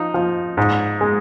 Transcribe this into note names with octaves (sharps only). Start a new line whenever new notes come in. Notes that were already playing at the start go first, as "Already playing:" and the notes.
Already playing: F3 D#4
F3
G#2
G#3